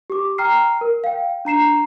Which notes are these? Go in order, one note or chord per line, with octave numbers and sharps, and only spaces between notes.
G4 D6
G5 A#5 F6 C7
A#4
F5 G5
D4 A#5 C7 E7